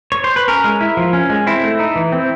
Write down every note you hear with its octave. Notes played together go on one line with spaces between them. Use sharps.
C#5
C5
B4
C#4 A#4
G#3
E4
F3
C#4
G#3
C4 E4
A3
D#4
E3
C4